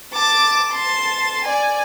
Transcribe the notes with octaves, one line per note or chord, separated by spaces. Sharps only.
A5 D6
A5 C6
D5 G#5